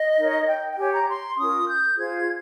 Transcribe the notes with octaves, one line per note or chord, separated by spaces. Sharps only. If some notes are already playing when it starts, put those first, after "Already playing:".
Already playing: D#5
D#4 A#4 C#5
G5
G5
G4 C#5 G#5
A#5
C6
C#4 F4 A#4 D#6
G6
F4 G#4 C5 G#6